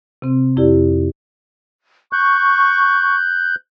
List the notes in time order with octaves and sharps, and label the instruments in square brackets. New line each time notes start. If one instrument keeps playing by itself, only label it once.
[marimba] C3 C4
F2 E4 G4 D5
[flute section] C#6 [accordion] F#6 G6